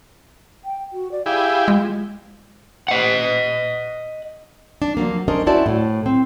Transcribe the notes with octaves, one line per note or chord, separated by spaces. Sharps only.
G5
F#4
D5
E4 G4 G#4 F5
G#3 F4
D#5 F#5
D4
F3 F#3 A#3
C#4 D4 A#4 C5 D#5
C#4 E4 F#4 C5 D5 A5
A2
C4